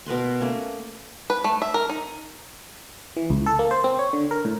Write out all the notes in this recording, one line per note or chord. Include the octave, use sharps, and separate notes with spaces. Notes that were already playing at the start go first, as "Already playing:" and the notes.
B2 A#4 B4 C6
A3 A#3 C#4
B4
A3
E5
A#4
D#4
E3
C#2
A4
A#3
C5
C4
C#5
D3
A#4
A2